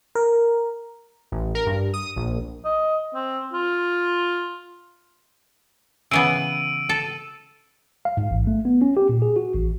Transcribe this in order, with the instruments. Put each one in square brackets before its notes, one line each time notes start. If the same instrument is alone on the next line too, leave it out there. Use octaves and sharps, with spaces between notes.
[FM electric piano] A#4
[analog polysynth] A1
A#4
G2
D#6
A#1
[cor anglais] D#5
C4
F4
[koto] C#3 E3 B3 [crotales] E6 D7 D#7
[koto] A4
[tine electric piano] F5
G#2
A1
A3
B3
C#4
G4
A#2
G#4
F#4
A1